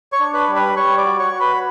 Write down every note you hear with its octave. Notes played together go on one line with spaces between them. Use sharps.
C#5 C#6
D4
B4 B5
G3
B4 B5
G3 C#5 C#6
D5 D6
F#4
C#5 C#6
F#4
B4 B5